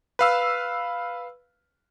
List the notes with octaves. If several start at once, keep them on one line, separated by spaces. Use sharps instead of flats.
B4 F5 E6